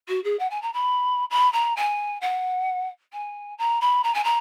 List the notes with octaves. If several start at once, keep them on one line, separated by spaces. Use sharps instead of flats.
F#4
G#4
F#5
G#5
A#5
B5
B5
A#5
G#5
F#5
G#5
A#5
B5
A#5
G#5
A#5